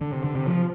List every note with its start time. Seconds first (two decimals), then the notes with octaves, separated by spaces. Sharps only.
0.01 D3
0.13 C3
0.24 D3
0.35 C3
0.47 F3